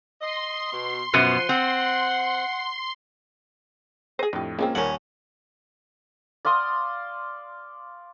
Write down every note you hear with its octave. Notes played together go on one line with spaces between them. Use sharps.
D#5 C6
B2
F#2 B2 F3 B3 F#6 C#7 D#7
C4 F#5
G#4 C5 A#6 D#7
F2 A2 D3 G4
C#3 G#3 A#3 C4 C#4 F4
D#2 F3 G3 C#4 A#4 F#5
D5 F5 C6 D#6